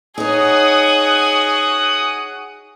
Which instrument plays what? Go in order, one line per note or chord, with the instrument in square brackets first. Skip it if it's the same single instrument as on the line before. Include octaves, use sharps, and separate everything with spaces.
[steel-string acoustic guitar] D#4 C#5 [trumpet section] F#4 F#5 D#6 [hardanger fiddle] G#4